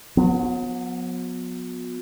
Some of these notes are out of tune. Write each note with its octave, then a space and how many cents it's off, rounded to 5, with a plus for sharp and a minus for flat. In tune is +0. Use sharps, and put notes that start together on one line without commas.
F#3 -40 B3 +0